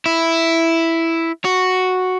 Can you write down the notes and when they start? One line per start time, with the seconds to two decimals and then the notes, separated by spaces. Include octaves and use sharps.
0.06 E4
1.45 F#4